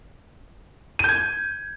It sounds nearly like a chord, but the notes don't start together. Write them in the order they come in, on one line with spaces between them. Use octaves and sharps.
D#7 G6 G#6